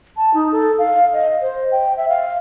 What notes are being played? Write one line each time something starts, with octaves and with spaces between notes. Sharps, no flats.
A5
D#4
A4
F5
D#5
C5
G5
E5
F5